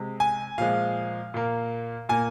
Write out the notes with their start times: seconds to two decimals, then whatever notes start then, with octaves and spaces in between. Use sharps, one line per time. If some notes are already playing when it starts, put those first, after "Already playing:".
Already playing: C3 G#3
0.20 G#5
0.58 A#2 F3 G#3 F5
1.34 A#2 A#3
2.09 A#2 A#3 G#5